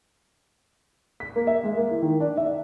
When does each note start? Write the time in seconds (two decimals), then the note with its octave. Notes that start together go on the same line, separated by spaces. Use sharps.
1.20 B6
1.36 A#3
1.47 E5
1.64 G#3
1.77 A#3
1.91 E3
2.02 D#3
2.20 D4
2.37 E5